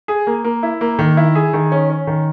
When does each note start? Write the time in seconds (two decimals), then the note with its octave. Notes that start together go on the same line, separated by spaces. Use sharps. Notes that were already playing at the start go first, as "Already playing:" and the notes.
0.08 G#4
0.27 A#3
0.44 A#3
0.63 E4
0.81 A#3
0.99 D#3
1.17 E4
1.35 G#4
1.53 D#3
1.72 C#4
1.90 C#4
2.07 D#3